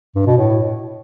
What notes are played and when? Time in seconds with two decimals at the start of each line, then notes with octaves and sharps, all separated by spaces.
0.15 G2
0.26 B2
0.37 A2